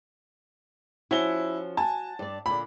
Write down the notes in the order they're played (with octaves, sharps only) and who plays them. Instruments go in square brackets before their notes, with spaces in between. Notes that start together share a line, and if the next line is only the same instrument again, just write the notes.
[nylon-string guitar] F3 C#4 F#4 [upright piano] E4 G7
[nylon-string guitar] F#4 G#5 [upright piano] A5
[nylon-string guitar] G2 D5
[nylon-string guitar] A#2 D3 [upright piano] B5